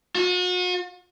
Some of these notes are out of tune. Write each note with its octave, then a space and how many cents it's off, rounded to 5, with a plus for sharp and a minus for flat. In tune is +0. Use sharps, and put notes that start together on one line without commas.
F#4 -40